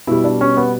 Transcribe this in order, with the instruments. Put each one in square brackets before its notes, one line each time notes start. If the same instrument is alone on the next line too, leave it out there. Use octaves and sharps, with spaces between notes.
[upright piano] B2 G3 E4
D4
C#4
B3